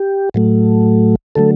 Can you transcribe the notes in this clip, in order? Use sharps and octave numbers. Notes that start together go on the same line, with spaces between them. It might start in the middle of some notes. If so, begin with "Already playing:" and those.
Already playing: G4
A2 F#3 A3
D3 F#3 A3 A4